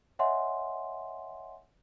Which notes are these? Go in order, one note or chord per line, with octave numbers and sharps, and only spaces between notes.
C#5 D#5 E5 F#5 G#5 C6